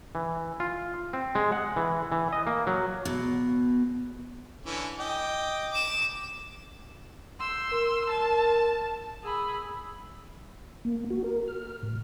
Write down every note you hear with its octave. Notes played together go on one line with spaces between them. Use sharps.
E3
F4
C4
G#3
F#5
E3
E3
D#5
A#3
F#3
B2
D3 E3 C#4
D#5 G5 D6
D6 E7
C6 E6 G6
A#4
A5
G#4 B5 E6
A#3
F#4
A#4
F6
A2